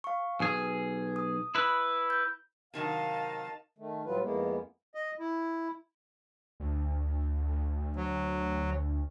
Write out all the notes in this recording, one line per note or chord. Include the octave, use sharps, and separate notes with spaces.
F5 C#6
B1 G#4 G#5
D#6
E4 B4
G6
C3 D#3 F#3 D#4 A#4 D#5 F5 A5
D#3 A3
A2 F#3 G3 F4 B4
F2 G#3 A#3 B3 E4
D#5
E4
D2
F#3